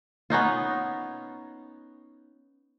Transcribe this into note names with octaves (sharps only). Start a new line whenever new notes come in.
B3 C#4 D#4 F4